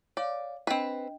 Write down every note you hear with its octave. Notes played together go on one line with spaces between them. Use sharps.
C#5 D5 F5
C4 D4 B4 D#5 G5